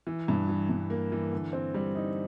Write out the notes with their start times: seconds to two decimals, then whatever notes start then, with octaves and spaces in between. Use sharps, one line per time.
0.07 E3
0.28 G2
0.49 E3
0.69 G2
0.90 A#3
1.12 E3
1.33 D3
1.53 C4
1.74 G3
1.95 D#4